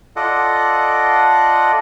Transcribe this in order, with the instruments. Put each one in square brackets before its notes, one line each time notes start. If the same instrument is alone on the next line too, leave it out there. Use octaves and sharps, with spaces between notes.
[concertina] F4 A4 D5 D#5 F#5